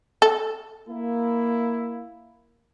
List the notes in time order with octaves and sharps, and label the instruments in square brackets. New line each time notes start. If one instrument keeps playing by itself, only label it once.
[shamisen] A4
[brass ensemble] A#3 E4